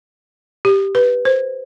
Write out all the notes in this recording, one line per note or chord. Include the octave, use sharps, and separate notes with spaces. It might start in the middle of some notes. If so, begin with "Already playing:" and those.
G4
B4
C5